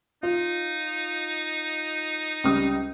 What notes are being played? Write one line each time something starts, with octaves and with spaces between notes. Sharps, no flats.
D#4 F4
C#2 G3 D#6